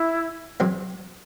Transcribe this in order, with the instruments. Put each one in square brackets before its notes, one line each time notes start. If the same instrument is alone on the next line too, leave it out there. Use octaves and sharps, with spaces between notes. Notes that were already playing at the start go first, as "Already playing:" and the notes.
Already playing: [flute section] E4
[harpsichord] E2 C3 F#3 C4